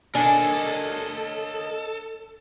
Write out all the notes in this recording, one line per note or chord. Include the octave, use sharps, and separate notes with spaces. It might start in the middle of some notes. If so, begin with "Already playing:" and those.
D4 A4 A#4 C#5 D#5 G#5